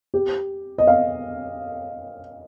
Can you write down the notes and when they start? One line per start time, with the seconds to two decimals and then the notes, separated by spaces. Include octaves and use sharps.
0.14 G4
0.78 D#5
0.87 F5